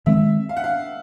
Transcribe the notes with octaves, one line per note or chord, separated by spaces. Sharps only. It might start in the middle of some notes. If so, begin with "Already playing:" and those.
D#3 G#3 C4 E5
F5
F#5
F5